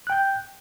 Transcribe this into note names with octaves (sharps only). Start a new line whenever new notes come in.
G5 F#6 G6